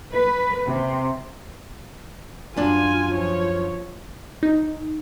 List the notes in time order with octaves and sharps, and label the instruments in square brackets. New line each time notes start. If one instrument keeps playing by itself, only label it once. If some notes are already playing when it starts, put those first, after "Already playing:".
[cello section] B4
C3
[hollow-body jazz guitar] F#2 D4 D5 [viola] F4 G#5
[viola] F3 C#5
[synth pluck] D#4